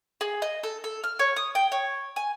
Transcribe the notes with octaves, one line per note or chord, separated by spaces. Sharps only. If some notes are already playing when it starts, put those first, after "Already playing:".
G#4
D#5
A4
A4
F6
C#5
D#6
G5
C#5
G#5